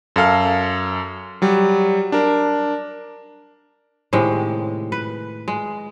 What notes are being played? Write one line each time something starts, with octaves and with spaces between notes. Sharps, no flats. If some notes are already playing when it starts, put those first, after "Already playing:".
F#2 A4 F5 F6
F#3 G3
D4 A#4
A2 C3 D#3 G#3
B4
G#3